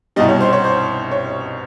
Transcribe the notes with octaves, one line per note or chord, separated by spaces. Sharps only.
C2 B2 G3 D#5
C#5
C5
C#5
C5
C#5